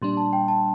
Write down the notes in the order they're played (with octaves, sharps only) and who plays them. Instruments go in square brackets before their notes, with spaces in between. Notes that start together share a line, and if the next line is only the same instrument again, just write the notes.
[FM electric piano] A#2 G3 D4 [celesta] C6
[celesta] A5
G5
A5